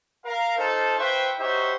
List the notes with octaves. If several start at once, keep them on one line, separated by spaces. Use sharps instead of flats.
A#4 F5
D#4 F4 A4 C5 A5
F4 B4 C5 E5 G5 C#6
D#4 F#4 G4 C5 C#5 E5